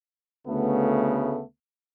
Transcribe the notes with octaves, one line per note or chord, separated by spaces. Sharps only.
D2 C#3 A3 B3